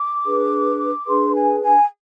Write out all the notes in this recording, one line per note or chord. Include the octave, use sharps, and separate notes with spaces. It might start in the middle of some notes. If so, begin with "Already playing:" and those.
Already playing: D6
D4 G#4 B4
D4 G#4 B4 C6
G#5
G#5